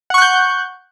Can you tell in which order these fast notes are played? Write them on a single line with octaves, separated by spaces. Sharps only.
F#5 C#6 F#6 G6